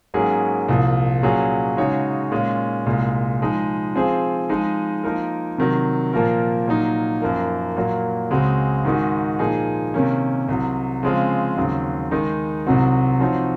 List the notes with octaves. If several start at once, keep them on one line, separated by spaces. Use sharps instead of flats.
G#2 F#3 A#3 C#4 G#4
C2 A#2 F3
A#2 F#3 C#4 G#4
C#3 G#3 D#4 F#4 C#5
A#2 G#3 C#4 F4
C2 A#2 G#3
F3 G#3 D#4
F3 C4 F4 G#4 C5
F3 G#3 D#4
F3 A#3 D#4 A#4
C3 D#3 F#3
A#2 F3 A#3 F4 A#4
A#2 F#3 A#3 D#4
F#2 F3 A#3
A#2 F#3 A#3
C#2 C#3 G#3 C4 F#4
G#2 D#3 G#3 D#4 F#4
A#2 F3 A#3 D#4 G#4
C3 D#3 A#3 C#4
C2 C3 F#3
C#3 F3 G#3 C4 F4
D#2 C#3 F#3 C4
D#3 G#3 D#4
C2 C3 F#3 C4 F#4
F3 C4 D#4 F#4 C#5